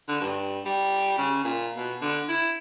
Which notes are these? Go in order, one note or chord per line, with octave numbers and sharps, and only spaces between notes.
D3
G2
G3
C#3
A#2
B2
D3
E4